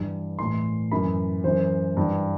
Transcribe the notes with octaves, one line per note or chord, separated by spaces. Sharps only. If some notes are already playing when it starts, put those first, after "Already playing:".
Already playing: G2 E3
A2 E3 C6
F#2 E3 B5
F#2 E3 C5
G2 E3